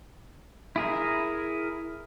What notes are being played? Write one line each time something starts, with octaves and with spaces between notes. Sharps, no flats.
E4 G#4 A#4